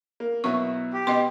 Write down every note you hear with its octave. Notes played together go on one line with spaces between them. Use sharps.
A#3
B2 F#3 E4 C#6
G4
B2 D#5 G5 C6